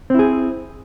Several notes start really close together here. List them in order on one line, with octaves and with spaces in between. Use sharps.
C4 E4 G#4